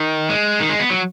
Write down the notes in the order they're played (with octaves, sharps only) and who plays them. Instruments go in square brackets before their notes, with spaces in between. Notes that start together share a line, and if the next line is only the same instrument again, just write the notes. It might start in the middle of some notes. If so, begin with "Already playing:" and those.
Already playing: [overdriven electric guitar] D#3
G#3
D#3
G#3
B3
F#3